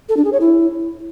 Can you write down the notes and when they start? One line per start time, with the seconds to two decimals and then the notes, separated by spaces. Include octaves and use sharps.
0.09 A4
0.17 D4
0.25 G#4
0.33 C#5
0.40 E4